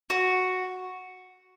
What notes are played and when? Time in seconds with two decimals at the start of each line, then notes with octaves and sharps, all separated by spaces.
0.10 F#4